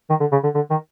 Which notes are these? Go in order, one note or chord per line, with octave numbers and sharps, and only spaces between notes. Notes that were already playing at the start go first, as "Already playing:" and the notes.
D#3
D3
C#3
D3
D3
D#3